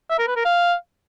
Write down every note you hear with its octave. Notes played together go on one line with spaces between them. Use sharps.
E5
A#4
B4
A#4
F5